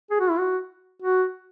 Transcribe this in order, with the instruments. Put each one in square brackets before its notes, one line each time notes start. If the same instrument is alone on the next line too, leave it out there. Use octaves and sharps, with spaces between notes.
[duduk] G#4
F#4
E4
F#4
F#4